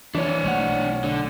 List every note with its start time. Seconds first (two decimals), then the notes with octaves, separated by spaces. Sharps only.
0.15 E3 D4 C#5
0.44 B1 A3 F#5
1.04 D3